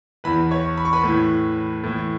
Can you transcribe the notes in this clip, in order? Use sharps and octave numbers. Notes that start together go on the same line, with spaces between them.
E2 E3 B4 B5
C#5 C#6
B5
C#6
B4 B5
A2 E3
A2 E3